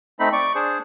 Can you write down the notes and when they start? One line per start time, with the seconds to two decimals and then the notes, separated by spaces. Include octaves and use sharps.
0.20 A3 C4 D#4 B5
0.32 D5 C#6
0.55 D4 G#4 C5